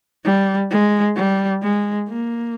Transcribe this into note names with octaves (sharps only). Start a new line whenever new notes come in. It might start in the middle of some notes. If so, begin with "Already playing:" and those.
G3
G#3
G3
G#3
A#3